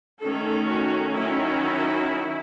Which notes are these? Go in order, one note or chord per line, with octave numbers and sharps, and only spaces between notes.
D#3 A3 C#4 A4
F#4
D#3 F#3 C#4 E4